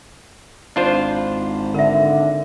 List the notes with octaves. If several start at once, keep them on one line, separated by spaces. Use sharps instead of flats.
G#1 D4 F4 C5
D3 A#4 E5